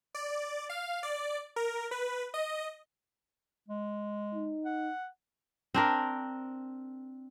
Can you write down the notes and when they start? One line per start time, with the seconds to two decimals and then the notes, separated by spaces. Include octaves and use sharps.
0.15 D5
0.69 F5
1.03 D5
1.56 A#4
1.91 B4
2.34 D#5
3.68 G#3
4.35 D#4
4.65 F#5
5.74 C4 D4 A#4